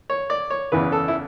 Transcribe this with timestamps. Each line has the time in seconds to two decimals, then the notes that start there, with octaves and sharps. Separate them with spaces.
0.10 C#5
0.30 D5
0.50 C#5
0.72 E2 C#3 E3 B4
0.92 A4
1.08 E4